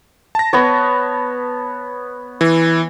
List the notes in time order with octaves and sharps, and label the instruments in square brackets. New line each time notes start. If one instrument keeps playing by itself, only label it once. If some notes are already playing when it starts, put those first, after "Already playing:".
[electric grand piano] A5 A#6
[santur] B3 C#5
[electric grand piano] E3